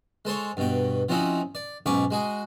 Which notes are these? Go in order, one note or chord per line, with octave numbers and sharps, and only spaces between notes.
G#3 A4 C5 C#5
G2 B2 G5
F3 C4 C#4 D#4 E4 F#4
D5
B1 G#2 C#4 B5 C#6 D6
G#3 F#4 G#4